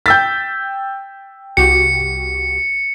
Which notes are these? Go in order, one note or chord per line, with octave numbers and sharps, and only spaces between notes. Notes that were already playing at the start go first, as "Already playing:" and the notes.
G5 E6 G6 A6 B6
C2 F#4 G4 C#7